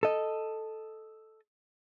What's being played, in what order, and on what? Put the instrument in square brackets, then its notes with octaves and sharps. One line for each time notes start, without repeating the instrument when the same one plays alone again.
[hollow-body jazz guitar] A4 D#5